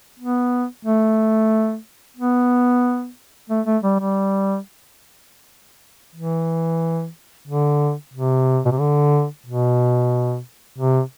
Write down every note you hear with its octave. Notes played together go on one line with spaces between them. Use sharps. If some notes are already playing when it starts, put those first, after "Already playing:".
B3
A3
B3
A3
A3
G3
G3
E3
D3
C3
B2
C3
D3
B2
C3